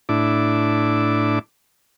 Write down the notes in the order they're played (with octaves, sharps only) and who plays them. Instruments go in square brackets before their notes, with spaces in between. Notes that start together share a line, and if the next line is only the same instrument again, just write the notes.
[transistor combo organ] A2 D4 E4 D6